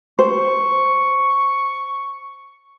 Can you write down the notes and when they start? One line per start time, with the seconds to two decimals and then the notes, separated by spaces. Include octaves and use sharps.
0.19 C5 C#6